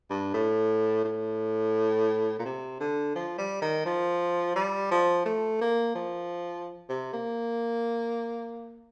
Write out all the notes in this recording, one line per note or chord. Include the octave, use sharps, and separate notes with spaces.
G2
A2
A2
A#2
C3
D3
F3
G3
D#3
F3
G3
F3
A3
A#3
F3
C3
A#3